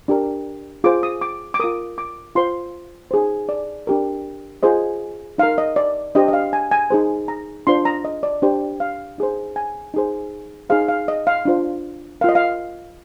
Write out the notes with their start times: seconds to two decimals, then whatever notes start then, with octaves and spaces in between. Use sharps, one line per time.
0.08 D4 G4 A#4
0.84 F4 G#4 C5 D6
1.03 D#6
1.21 D6
1.54 D6
1.60 F4 A#4 D#6
1.98 D6
2.35 F4 C5 C6
3.11 D#4 G#4 C5
3.49 D5
3.87 D4 G4 A#4
4.63 F4 G#4 C5 D#5
5.38 D#4 A#4 F5
5.58 D#5
5.76 D5
6.15 D4 G4 C5 D#5
6.28 D#5
6.33 F5
6.53 G#5
6.71 G#5
6.90 D#4 G#4 C5
7.28 A#5
7.67 D4 F4 C5 C6
7.85 A#5
8.05 D#5
8.23 D5
8.42 D4 G4 C5
8.80 F5
9.18 D#4 G#4 C5
9.56 G#5
9.94 D#4 G#4 C5
10.69 D#4 G#4 C5 F5
10.88 F5
11.08 D#5
11.27 F5
11.45 D4 F4 C5
12.21 A#4 F5
12.24 F4 D#5
12.35 F5